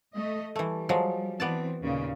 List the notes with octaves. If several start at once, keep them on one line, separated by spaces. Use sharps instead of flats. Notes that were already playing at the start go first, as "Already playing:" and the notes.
A3 D#5
E3 G3 A3
F3 F#3 G#3
E3 B3 C4 D5 A5
D#2 A#2 C#3